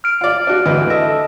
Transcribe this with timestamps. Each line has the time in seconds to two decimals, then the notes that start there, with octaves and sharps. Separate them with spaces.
0.04 F6 D7
0.21 F4 D5
0.47 D4 F#4
0.65 D2 E3 D#5
0.90 A4 D#5 E5 A#6